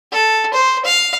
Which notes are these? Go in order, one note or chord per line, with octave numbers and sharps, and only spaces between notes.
A4
C5
F5